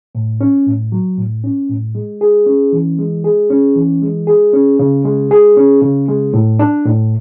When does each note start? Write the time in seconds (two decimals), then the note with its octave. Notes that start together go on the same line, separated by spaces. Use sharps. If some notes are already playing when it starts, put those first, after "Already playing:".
0.15 A2
0.41 C#4
0.66 A2
0.92 F#3
1.18 A2
1.44 C#4
1.69 A2
1.95 G#3
2.21 G#4
2.46 C#4
2.73 E3
2.98 G#3
3.24 G#4
3.50 C#4
3.76 E3
4.02 G#3
4.27 G#4
4.53 C#4
4.79 C#3
5.05 G#3
5.31 G#4
5.57 C#4
5.82 C#3
6.08 G#3
6.34 A2
6.59 D4
6.86 A2